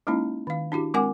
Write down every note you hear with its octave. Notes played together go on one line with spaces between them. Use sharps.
G#3 A#3 C#4 D#4 E4
D#3 F5
D4 E4 F#4 G4
G#3 C4 A#4 F#5 G#5 D6